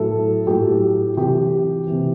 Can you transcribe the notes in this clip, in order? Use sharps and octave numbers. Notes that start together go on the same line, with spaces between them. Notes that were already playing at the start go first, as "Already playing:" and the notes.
Already playing: A2 F#3 A4
A2 F#3 G4
C3 E3 G4
C3 E3